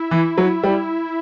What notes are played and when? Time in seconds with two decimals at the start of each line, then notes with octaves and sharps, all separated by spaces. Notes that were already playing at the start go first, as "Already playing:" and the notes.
Already playing: E4
0.11 E3
0.38 F#3
0.63 G3